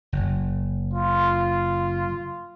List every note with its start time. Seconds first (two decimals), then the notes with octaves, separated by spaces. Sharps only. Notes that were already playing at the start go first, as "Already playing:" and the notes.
0.12 F#1
0.94 F4